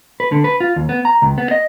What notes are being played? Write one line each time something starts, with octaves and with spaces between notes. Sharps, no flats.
B4
D3
B4
F4
D#2
B3
A#5
C#2
B3
D#5